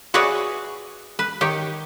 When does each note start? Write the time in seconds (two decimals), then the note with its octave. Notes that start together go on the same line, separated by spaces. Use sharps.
0.14 F#4 G#4 B4 C#5 D5 E5
1.19 B4
1.41 D#3 G4 C#5